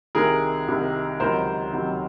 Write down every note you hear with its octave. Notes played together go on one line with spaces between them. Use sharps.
C2 C3 D#3 G#4 A#4
C2 C3 D#3
C#2 C3 D#3 F#3 A#4 C5
C#2 C3 D#3 F#3